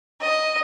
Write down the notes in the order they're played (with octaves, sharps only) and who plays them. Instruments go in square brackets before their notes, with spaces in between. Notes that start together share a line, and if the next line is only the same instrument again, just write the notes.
[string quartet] D#5